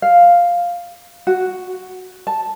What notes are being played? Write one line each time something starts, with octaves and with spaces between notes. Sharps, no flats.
F5
F#4
A5